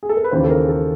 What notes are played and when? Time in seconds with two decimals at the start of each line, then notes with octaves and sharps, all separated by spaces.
0.03 G#4
0.09 A4
0.17 A#4
0.24 B4
0.31 D#2 C#3 E3 C5
0.44 A4
0.50 A#4
0.69 A4